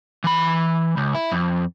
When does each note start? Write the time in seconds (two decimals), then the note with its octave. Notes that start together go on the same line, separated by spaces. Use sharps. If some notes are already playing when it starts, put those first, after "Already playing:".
0.24 E3 B5
0.97 C#2
1.15 E4
1.32 F2